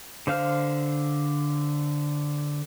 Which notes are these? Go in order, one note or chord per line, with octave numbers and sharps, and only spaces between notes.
D3 C5 F5 F6